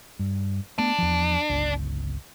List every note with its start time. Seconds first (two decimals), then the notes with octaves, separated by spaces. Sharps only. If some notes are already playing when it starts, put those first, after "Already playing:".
0.19 G2
0.78 A3 B3 D4
0.98 E2 F3
1.50 G1 C#2